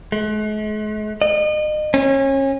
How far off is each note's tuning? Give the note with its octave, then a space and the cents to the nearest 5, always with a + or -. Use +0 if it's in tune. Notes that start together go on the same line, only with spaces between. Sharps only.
G#3 +45
D#5 -35
C#4 -30